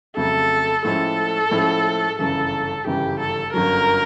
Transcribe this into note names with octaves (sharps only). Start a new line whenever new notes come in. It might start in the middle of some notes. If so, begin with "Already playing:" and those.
F2 C#3 F#3 A3 A4
A2 F3 G#3 C#4 E4 A4
A2 F3 G#3 C#4 E4
G1 F#2 C#3 E3 A4
G1 F#2 C#3 E3 G4
A4
G1 F#2 D3 F#3 A#4